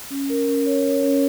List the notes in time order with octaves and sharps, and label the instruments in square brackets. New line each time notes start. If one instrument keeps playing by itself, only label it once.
[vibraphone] C#4
A#4
C#4
C#5
C#5
C#4